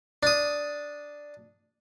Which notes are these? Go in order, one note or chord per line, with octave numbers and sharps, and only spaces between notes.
D4 D#6